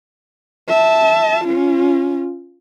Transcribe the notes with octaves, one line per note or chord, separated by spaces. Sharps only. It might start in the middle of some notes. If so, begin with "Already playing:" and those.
E5 A5
C#4 F4